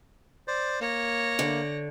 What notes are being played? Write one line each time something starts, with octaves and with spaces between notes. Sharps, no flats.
C5 D5
A#3 C#5 A#6
D3